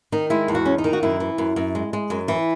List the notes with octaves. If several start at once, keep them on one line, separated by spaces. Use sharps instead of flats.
D#3 D#4
G#3 E4
E2
F#4
C#4
D#4
D#3
F#4
F#2 E4
E3
F#2
F#2
G#3
G#3
F#2
E3